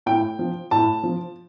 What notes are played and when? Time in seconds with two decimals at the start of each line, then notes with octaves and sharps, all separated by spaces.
0.06 A2 G5
0.39 F3
0.71 A2 A5
1.03 F3